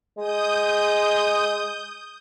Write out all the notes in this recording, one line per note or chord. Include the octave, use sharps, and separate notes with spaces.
G#3 D#6 G6